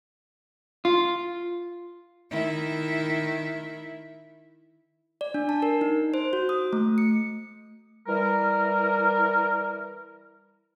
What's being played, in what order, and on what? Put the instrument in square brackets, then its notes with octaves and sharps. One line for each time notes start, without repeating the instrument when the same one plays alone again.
[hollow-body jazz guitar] F4
[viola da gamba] D#3 E4
[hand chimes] D5
D4
A5
A#4
D#4
C5
F#4
D#6
A3
C#7
[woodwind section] E3 G3 A#4